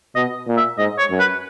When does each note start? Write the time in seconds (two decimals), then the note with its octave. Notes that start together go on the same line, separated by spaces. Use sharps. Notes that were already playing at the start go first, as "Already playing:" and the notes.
0.15 B2 D#5
0.47 A#2
0.57 E5
0.78 G#2 D#5
0.98 C#5
1.10 F#2
1.19 B4